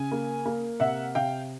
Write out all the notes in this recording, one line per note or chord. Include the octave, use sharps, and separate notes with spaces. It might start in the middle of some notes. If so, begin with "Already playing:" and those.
Already playing: C#3 G#5
A#3
A#3
C3 E5 F#5
C3 F5 G5